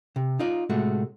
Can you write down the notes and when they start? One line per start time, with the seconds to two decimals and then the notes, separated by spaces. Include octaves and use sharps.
0.16 C3
0.39 D#4 F4 D5
0.70 A2 C3 G#3 A3 F#4